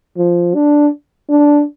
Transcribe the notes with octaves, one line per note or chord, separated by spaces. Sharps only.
F3
D4
D4